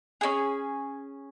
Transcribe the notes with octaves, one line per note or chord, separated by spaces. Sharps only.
C#4 E4 G#4